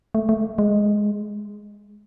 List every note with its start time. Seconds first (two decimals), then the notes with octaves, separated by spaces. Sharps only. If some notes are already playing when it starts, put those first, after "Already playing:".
0.15 A3
0.29 A3
0.58 G#3